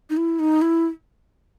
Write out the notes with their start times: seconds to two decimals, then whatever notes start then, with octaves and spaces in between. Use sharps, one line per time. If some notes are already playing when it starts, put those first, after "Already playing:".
0.10 D#4
0.17 E4
0.39 D#4
0.62 E4